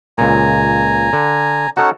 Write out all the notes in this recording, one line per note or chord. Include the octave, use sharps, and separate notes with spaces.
C#2 A#2 G#5 A#5
D3
C#4 D#4 F#4 A4 C#5 F#5